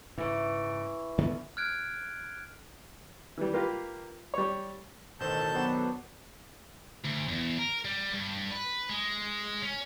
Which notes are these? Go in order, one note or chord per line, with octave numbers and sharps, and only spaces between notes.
G#2 C#3 E3 C#5
D2 D3 B3
F6 F#6 G#6 D7
E3 G3
A#3 F4 G4 B4
G3 C#5
A1 B2 D#3 A4 C5 A5 G6
F#3 B3 D4 F#4 C5 G5
D2
E2
A#4
G3
G2
B4
G#3
C#4